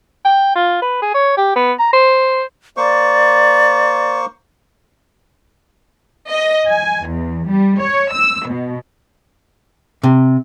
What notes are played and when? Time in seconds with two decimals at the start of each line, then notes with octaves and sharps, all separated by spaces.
0.25 G5
0.55 F4
0.82 B4
1.02 G#4
1.14 C#5
1.37 G4
1.56 B3
1.79 A#5
1.93 C5
2.77 A#3 C5 D5 C#6
6.30 D#5
6.69 G#5
7.08 E2
7.48 G3
7.81 C#5
8.12 E6
8.49 B2
10.03 C3